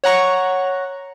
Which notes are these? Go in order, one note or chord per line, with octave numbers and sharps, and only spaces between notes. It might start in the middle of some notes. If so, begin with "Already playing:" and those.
C#5 F#5 A#5 C#6